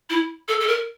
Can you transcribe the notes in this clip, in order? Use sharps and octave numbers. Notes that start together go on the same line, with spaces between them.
E4
A4
A4
A#4